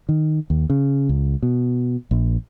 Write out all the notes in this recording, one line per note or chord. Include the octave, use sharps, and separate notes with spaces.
D#3
D#2
C#3
C#2
B2
A#1